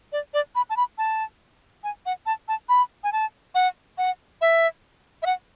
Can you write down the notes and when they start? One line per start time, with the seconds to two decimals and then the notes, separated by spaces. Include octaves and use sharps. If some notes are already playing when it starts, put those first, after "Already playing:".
0.12 D5
0.34 D5
0.55 B5
0.70 A5
0.77 B5
0.98 A5
1.84 G#5
2.06 F#5
2.26 A5
2.48 A5
2.69 B5
3.04 G#5
3.13 A5
3.55 F#5
3.98 F#5
4.41 E5
5.23 E5
5.26 F#5